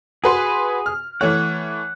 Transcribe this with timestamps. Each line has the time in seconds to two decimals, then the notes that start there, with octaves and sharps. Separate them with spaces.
0.24 F#4 G#4 B4 C6
0.86 F6
1.21 E3 A3 C#5 F#5